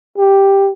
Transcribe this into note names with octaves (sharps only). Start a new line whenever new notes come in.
G4